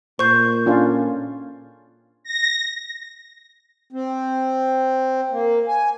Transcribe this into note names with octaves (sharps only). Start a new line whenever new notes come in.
A#2 C5 C#6 G6
C#4 D4 F4
A#6
C4
A#3
G#5